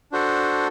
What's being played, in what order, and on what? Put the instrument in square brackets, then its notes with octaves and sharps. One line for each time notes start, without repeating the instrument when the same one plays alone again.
[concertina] D4 F#4 A4 C5